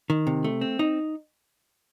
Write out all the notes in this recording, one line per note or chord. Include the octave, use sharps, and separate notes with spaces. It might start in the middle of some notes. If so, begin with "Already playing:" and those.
D#3
C3
A3
C4
D#4